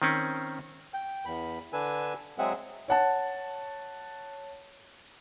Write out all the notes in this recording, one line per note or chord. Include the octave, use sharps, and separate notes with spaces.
D#3 C4 C#4
G5
E2 B5
D3 D4 B4 G#5 E6
F#3 G#3 C4 G#4 E5 F#5
C#5 F#5 A5